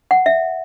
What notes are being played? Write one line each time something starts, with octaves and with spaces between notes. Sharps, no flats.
F#5
E5